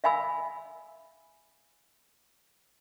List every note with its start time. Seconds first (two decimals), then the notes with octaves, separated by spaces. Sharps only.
0.04 E5 F5 G#5 B5 E6